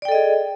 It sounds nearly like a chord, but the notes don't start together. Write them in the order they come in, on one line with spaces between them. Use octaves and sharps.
D5 G5 A4 D#5 G#4